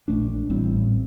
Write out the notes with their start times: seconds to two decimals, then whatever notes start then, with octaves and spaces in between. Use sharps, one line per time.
0.08 A#1 A2 A3 D4
0.50 A1 A2 G3 C4